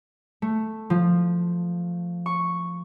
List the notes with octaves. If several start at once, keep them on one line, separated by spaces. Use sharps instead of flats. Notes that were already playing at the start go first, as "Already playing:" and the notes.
A3
F3
C#6